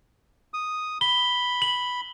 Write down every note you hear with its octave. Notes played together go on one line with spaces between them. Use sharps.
D#6
B5 G7
F#7